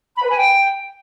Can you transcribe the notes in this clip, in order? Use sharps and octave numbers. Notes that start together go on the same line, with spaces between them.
B5
B4
G#5
G5